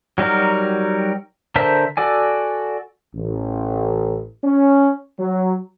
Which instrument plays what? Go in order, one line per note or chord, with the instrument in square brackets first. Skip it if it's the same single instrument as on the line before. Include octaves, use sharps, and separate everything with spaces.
[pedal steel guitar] F#3 G3 D#4 F#4 A#4
D3 A#4 C5 E5 A5
F#4 A4 D5 G#5
[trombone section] A1
C#4
F#3